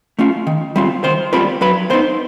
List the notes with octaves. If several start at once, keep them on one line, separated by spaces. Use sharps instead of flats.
A3 C#4 F4
D#3
G3 C4 F4
D#3 C5 C6
G3 C4 F4 B4 B5
F#3 B4 B5
B3 D#4 C5 C6